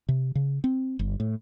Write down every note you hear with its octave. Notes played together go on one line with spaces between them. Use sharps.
C3
C#3
C4
G1
A2